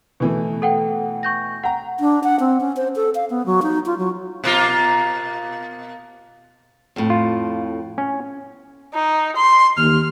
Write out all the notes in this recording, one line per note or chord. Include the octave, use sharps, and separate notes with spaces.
B2 E3 A3
A4 F#5 G5
C#6 G6 A#6
F#5 G5 A#5
D4
F#5
C4
C#4
C5
A4
F5
B3
F#3
D#4
F4
F#3
B2 A#3 F4
F2 A2
F4
C#4
D#4
C6
D#2 F6